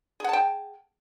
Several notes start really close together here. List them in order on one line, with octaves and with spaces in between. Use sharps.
G#4 F#5 A5 G5